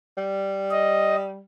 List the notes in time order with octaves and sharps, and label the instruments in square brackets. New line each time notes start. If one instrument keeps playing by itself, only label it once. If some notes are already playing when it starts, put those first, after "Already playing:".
[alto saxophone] G3
[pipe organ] D#5